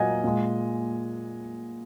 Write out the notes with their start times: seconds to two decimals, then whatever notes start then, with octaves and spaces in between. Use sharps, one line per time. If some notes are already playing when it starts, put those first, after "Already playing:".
Already playing: A#2 F#3 A#3 D#5 F#5 G#5
0.24 A#2 G#3